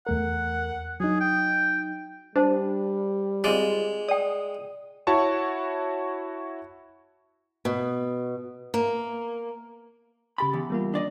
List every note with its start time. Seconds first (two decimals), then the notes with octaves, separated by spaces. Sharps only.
0.07 E2 A3 A#4 F#5
1.00 F#3 D#4 G#4
1.20 G5
2.36 G3 D4 C5 A5
3.44 G#3 C4 F4 D5
4.09 D5 G5 D#6
5.07 E4 F#4 C#5 A5 C#6
7.65 B2
8.74 A#3
10.38 C#3 G4 B5 A6
10.53 E2
10.70 G3 A#3 F4
10.94 D4 D5 D#5